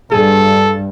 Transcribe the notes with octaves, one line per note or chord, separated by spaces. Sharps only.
G2 G#4 A4